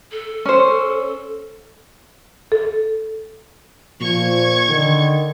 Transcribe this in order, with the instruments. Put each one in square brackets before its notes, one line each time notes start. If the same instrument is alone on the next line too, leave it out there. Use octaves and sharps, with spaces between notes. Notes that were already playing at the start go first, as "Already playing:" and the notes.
[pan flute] A4
[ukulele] C#4 C5
[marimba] A4
[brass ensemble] A#2 F3 [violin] C#6 G#6
[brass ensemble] D3 D#3